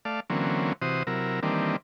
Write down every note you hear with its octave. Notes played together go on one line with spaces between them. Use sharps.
A3 D5 F5
D3 E3 F#3 A#3 C4 C#4
C3 E3 F#4 C5 D#6
C3 F#3 E4 A#4
D#3 E3 G3 A#3 C4 D4